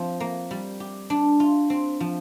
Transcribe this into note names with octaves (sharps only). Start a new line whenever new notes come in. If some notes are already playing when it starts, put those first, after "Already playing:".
Already playing: F3 C4
A#3
G3
G4
D4
F4
C4
F3